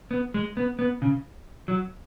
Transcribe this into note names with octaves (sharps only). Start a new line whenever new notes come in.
B3
G#3
B3
B3
C#3
F#3